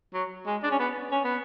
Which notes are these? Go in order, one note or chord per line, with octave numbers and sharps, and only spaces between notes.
F#3
G#3
D4
C#4
B3
C#4
B3